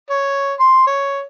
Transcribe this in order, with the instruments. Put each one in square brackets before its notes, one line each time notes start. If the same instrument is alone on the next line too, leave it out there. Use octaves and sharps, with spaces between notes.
[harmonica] C#5
C6
C#5